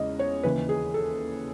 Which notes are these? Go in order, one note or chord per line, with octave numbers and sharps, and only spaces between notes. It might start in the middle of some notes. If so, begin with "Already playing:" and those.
Already playing: E2 C#3 G#3 C#4 D#5
C#5
D#2 C#3 E3 B4
G#4
A4